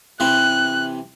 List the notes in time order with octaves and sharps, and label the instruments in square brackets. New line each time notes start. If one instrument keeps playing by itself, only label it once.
[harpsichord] C3 E3 C4 [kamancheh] F#6